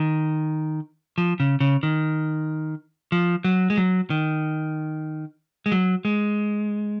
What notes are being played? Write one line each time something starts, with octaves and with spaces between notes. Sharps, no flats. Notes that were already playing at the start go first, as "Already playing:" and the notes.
Already playing: D#3
F3
C#3
C#3
D#3
F3
F#3
G#3
F#3
D#3
G#3
F#3
G#3